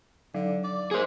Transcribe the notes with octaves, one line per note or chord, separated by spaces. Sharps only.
D3 F#3
D5
A#3 G#4 C5